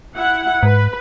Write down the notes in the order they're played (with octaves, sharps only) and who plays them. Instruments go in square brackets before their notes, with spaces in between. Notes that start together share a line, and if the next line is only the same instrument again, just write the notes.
[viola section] E4 F#5
[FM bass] G#2 [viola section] B4